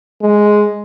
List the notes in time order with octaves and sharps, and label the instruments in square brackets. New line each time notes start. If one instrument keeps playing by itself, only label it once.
[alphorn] G#3